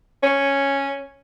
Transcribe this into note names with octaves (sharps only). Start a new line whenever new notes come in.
C#4